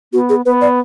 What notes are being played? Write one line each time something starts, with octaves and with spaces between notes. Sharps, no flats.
B3 F#4
G#4
B3 B4
D5